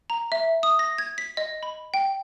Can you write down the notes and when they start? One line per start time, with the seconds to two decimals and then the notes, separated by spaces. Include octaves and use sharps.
0.10 A#5
0.32 E5
0.63 D#6
0.79 A#6
0.98 G#6
1.18 B6
1.37 D#5
1.63 B5
1.94 G5